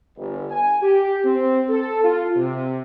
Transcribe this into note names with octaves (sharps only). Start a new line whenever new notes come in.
G1
G#5
G4
C4
A4
F4
C3